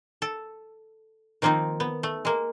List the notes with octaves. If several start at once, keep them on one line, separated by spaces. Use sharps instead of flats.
A4
D#3 F3 A#3 C4 D#4
B3
A3
G#3 A#3